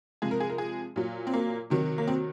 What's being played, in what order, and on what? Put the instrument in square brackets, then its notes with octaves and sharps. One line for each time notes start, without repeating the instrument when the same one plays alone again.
[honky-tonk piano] C3 F3 G#3 G#4
A#4
G#4
A#4
G#4
A#2 F#3
C4
A#3
C3 D#3 F#3
A#3
C4